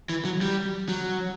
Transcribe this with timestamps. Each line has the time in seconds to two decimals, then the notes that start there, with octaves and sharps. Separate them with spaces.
0.09 E3
0.25 F#3
0.41 G3
0.89 F#3